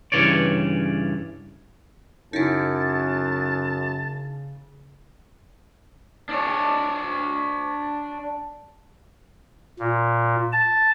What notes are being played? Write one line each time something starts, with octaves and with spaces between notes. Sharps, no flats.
G2 A#2 C#3 E3 C#5 D5
F#2 C#3 D#4 E4 A5
D4 C#5
A#2
A5